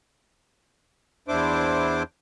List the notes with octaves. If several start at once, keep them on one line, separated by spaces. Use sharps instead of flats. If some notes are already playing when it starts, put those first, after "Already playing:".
E2 D4 E4 C5 D6